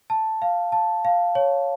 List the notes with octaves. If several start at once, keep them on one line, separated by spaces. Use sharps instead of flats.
A5
F5
A5
F5
C#5